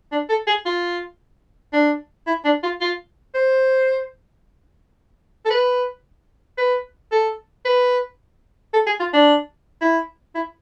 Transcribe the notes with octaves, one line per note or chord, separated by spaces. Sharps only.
D4
A4
G#4
F4
D4
E4
D4
F4
F4
C5
A4
B4
B4
A4
B4
A4
G#4
F4
D4
E4
E4